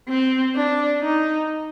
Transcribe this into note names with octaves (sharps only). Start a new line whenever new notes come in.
C4
D4
D#4